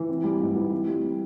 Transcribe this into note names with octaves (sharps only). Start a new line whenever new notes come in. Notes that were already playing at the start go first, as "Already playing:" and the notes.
Already playing: E3
C4
G3
G#2
E3
C4
G3